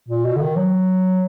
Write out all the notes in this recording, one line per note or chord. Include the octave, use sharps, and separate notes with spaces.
A#2
B2
D3
D#3
F#3